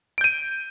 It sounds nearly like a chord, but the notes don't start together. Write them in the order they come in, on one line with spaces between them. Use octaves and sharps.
D7 G6 D#7